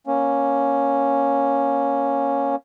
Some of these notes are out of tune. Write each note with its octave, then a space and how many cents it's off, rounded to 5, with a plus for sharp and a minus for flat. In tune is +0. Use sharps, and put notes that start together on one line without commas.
A#3 +15 C#4 +0